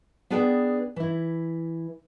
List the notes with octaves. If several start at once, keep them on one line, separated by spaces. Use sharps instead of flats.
B3 D4 G#4 B4 D5 G5
E3 E4